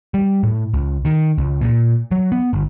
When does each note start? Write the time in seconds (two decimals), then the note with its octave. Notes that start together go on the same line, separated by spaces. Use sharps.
0.14 G3
0.43 A2
0.74 C#2
1.05 D#3
1.38 C#2
1.61 A#2
2.12 F#3
2.32 B3
2.53 G1